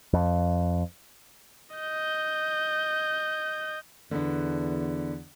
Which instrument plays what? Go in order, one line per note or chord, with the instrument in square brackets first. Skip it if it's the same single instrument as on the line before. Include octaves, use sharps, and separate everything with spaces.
[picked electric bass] F2
[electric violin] D#5 G6
[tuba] E2 [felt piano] D3 B3 D4